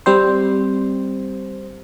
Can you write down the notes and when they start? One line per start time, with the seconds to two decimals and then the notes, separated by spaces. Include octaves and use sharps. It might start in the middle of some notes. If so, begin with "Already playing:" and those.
0.06 G3 C4 C5